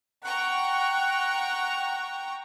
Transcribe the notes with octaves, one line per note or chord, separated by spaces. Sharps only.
F#5 G5 A#5 C#6